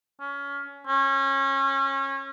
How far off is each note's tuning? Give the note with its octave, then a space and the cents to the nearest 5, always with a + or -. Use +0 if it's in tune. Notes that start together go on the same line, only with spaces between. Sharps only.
C#4 +25
C#4 -25